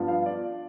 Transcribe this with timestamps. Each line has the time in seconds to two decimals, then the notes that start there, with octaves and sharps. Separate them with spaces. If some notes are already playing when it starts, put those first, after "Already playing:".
Already playing: G2 F3 B3
0.08 F4 F5
0.26 D5